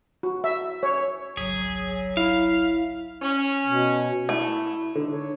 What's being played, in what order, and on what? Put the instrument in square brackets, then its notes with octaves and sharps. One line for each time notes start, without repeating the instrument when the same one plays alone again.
[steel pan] F#4
E5
C#5
[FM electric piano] G#1 C#2 B6 [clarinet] F#3 [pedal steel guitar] G#4
[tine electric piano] E4 [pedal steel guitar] F5
[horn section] C#4
[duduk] B2
[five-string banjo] A3 [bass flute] E4
[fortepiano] D3 [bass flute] D#4
[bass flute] C#5